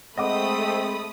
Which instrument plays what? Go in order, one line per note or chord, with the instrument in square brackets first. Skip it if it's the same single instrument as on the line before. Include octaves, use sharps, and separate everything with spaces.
[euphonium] G#3 [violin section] A3 B5 D#6 [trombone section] C4 [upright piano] D#5 F#5 D6